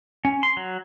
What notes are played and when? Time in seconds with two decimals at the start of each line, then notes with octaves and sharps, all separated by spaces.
0.25 C#4
0.43 C6
0.57 F#3